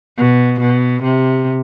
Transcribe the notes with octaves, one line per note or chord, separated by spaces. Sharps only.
B2
B2
C3